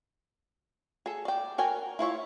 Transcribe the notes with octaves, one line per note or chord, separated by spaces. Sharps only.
G#4 A4
D5 G5
F#4 A#4 G5 G#5
E4 F4 C#5 E5